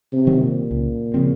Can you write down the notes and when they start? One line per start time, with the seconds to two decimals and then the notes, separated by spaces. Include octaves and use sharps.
0.12 C3
0.27 D#3 F#3 C4
0.41 A#2
0.71 C#2
1.14 C#3 F3 C4